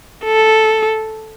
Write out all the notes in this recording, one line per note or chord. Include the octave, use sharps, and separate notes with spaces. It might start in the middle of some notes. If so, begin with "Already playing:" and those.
A4